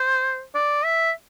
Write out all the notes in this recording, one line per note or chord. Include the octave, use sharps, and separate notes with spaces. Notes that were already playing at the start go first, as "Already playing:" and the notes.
Already playing: C5
D5
E5